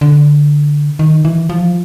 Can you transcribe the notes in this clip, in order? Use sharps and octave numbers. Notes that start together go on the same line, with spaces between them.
D3
D#3
E3
F3